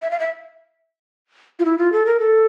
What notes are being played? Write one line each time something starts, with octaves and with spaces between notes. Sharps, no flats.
E5
F5
E5
F4
E4
F4
A4
A#4
A4